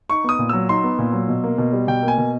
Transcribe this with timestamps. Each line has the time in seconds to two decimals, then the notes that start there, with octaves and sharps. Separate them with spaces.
0.10 D#4 C#6
0.24 B3 D#6
0.39 A#2
0.49 F#3 E6
0.69 D#4 C6
0.84 B3
0.98 A#2
1.13 F#3
1.28 B2
1.44 A#3
1.58 B2
1.72 G3
1.88 B2 G5
2.03 A#3
2.08 G#5
2.18 B2